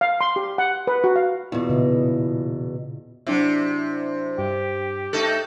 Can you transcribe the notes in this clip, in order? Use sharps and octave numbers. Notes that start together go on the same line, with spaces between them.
F5
C6
G4
F#5
B4
F#4
F5
E2 B2 E4 F4
A#2 C#3 D#5
C3 F#3 D4 E4
G2 G4
A3 D#4 A4 F#6